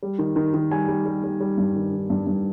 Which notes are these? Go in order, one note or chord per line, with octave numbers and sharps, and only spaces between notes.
G3
D#3
D#3
D#3
G3 G#5
G3
G3
G3
G3
G2
D#3
D#3
G2
G2